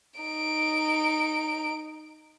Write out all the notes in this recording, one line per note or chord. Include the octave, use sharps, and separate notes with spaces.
D#4 D7